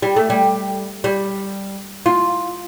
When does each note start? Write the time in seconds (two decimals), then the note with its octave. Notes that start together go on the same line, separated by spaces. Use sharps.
0.02 G3
0.16 A3
0.30 G3
1.04 G3
2.06 F4